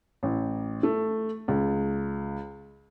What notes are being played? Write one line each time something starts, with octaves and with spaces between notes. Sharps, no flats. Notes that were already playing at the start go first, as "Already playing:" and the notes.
A1
A3
C#2